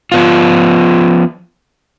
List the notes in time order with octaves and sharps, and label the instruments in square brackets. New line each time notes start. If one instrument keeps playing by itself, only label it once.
[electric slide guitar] F3 B3 F4